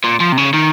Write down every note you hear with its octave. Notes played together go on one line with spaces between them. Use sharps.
A#2
F3
C3
C#3
D#3